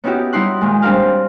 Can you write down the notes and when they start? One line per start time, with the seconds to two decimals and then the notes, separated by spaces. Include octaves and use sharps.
0.04 B3 C#4 D#4 E4 F#4 G4
0.33 G3 D#4 E4 C6 F#6
0.61 A#2 D#3 G#3
0.82 G3 C4 D4 G4 A#4 F5